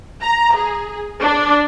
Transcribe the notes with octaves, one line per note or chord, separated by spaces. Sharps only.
A#5
G#4
D4